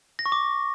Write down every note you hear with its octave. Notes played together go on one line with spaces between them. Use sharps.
A#6
C#6
D6